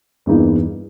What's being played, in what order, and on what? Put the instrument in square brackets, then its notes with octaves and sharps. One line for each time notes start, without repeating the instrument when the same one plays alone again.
[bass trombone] E2 [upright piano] G2 E3 A#3 D#4